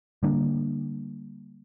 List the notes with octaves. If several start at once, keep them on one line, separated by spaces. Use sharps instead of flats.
D3 G3 A#3 D4